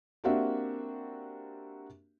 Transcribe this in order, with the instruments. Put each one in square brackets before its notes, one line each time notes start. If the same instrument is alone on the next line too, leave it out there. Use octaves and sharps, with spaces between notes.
[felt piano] A#3 C4 D4 F#4 G4 E5